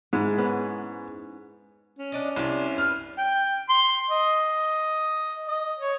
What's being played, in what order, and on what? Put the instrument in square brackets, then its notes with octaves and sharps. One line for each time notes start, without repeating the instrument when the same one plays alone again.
[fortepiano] G#2 [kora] G#3 E4
[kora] B3 C#4
[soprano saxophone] C#4
[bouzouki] D4 D5 D#5
[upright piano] C2 [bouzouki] C3 D4 D5
[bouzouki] B4 [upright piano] F6
[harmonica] G5
C6
D#5
D#5
C#5